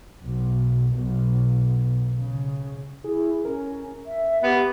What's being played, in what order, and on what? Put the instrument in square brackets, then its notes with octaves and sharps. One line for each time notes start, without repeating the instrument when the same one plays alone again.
[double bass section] B1
B1
C#3
[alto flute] E4 [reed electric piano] G#4
[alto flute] C#4 [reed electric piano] A#4
[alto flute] E5
[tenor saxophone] B3 [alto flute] G4